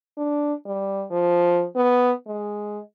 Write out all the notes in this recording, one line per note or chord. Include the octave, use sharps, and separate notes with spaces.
D4
G3
F3
B3
G#3